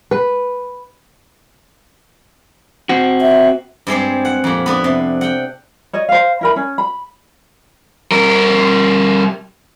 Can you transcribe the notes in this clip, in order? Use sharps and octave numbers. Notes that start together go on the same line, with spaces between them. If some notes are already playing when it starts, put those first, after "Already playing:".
B4
C4 F#4
E5
G2 G#3 C4 G4
F#5
F2 A#2
B3 D4 B4
C3
F#5 G5
C#5 D#5
C5 F5
E4 A#4 B5
C#4
B5
G3 A#4